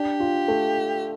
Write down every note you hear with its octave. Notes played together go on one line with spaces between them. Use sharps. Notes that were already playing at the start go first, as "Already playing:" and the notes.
Already playing: D4 G4
F4
A3